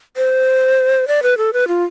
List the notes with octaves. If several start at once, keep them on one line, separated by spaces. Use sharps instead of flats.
C5
D5
B4
A4
B4
F4